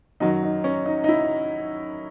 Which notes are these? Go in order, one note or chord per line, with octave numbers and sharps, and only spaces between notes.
F#2 D#3 F#3 D#4
D#4
C#4
D#4
D#4
E4